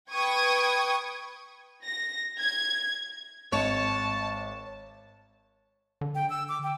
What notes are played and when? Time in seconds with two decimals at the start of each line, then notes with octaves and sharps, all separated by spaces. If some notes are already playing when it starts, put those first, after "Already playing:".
0.12 B4 G5 C#6 D#6 G#6
1.84 A#6
2.39 G#6
3.52 G#1 C#5 D#5 A5
6.01 D3
6.15 G5
6.30 E6
6.49 D6
6.64 G5